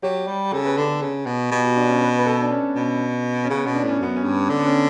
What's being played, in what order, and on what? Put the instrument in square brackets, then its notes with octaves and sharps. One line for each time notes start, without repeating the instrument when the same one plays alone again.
[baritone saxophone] F#3 [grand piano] G4
[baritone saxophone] G3
[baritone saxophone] C#3 [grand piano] A4
[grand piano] B4
[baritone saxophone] D3 [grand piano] A4
[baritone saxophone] C#3
B2
[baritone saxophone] B2 [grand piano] G4
[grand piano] F#4
D4
C#4
B4
B4
A4
D4
C#4
[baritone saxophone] B2
[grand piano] C#4
[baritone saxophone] C#3 [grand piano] B3
[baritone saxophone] B2
[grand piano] D4
[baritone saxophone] A2
[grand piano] C#4
[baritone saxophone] F#2 [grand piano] B3
[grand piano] C#4
[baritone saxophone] G2
[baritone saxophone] D3 [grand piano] D4
[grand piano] B3
C#4